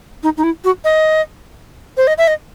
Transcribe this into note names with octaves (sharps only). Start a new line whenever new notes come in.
D#4
D#4
E4
F#4
D#5
C5
D#5
E5
D#5